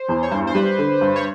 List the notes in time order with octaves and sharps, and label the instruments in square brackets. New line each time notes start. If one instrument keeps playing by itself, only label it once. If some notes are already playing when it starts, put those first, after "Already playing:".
Already playing: [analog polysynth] C5
[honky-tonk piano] E2
[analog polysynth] C#5
[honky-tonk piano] G2 [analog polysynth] C5
[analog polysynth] C5
[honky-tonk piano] G3 [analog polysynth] B4
[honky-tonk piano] D3
G2
[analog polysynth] C#5